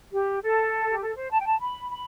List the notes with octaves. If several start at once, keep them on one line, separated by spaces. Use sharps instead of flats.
G4
A4
G4
A4
C5
A5
G5
A5
B5
B5